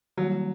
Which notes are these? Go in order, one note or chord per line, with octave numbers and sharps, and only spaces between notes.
D#3 F#3 G3 A#3